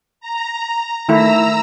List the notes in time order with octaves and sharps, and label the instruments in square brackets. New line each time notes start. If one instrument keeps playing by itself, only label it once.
[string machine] A#5
[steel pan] D#3 A3 E4 [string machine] A#5 E6